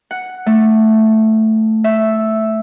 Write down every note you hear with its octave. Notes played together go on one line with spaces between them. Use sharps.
F#5
A3
E5